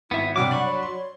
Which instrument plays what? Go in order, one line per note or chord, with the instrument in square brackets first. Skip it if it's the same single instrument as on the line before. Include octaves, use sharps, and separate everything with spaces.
[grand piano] G#1 [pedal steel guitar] B3 E5 [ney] E4
[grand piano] G2 C3 G3 [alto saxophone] F#3 [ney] F#5 [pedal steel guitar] D6
[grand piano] D4 [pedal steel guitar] D5 B5 C#6
[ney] C#5
[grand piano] C6